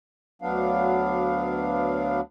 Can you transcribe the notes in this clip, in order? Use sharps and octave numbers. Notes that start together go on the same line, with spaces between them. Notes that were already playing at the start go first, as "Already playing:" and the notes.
D2 F#3 B3 D4 F5